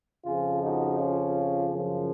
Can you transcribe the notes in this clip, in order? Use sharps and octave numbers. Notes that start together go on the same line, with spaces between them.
F2 C#3 F3 F4 G#4
D#4 F#4
C#4 F4
F#2 C#3 F3